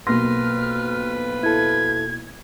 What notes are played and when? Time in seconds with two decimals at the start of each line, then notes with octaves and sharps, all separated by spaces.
0.07 B1 F2 A#3 F4 B4 C6 F6 A#6
1.43 E4 A4 G#6